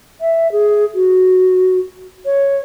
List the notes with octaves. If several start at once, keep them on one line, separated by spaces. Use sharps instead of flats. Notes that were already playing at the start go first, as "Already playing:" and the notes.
E5
G#4
F#4
C#5